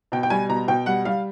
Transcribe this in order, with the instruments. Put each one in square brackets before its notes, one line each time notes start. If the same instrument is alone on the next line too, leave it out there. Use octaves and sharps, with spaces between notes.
[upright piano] B2 G5
G5
G3 G#5
B2 A#5
B2 G5
G3 F#5
G3 F5